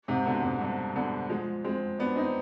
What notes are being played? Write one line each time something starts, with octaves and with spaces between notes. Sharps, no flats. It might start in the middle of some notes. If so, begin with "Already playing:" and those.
G#2 C3
B2 D3
G#2 C3
G2
B2 D3
F3 G#3
G#3 C4
B3 D4
C4 D#4